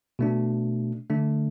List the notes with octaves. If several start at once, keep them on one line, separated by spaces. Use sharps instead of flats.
B2 A3 D4
D3 A3 D4